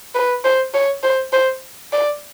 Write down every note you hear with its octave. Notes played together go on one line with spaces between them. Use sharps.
B4
C5
C#5
C5
C5
D5